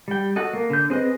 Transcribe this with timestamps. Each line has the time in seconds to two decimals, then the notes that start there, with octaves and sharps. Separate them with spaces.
0.08 G3 G5
0.36 F#4 A4 D#5
0.53 A#3
0.70 D3 G6
0.90 C4 G#4 B4 D#5